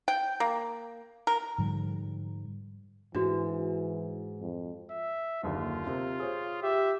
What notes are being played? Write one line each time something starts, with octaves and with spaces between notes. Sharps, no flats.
G5
A#3
A#4
G#2 D3 F3 G3
G#2 E3 D4 F#4
F2
E5
F#1 D#2 D3 F4
C3 C4 A#4
G#4 C5 C#5
G4 E5